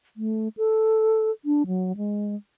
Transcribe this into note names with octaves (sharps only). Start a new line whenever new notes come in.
A3
A4
D4
F#3
G#3